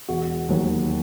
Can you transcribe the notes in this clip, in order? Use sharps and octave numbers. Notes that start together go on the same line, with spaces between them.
E1 F#4
D#2 D#3 F#3